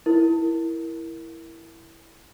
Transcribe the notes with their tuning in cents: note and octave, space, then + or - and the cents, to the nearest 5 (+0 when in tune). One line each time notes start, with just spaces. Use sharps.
E4 +5 A#4 +0